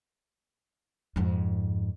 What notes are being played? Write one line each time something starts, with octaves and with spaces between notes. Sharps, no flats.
F2 G#2